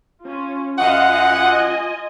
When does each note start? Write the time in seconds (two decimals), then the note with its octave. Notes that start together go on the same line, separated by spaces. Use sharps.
0.25 C#4 F4
0.78 F#2 F4 D#5 F5 F#5
1.33 F4 D#5 G#5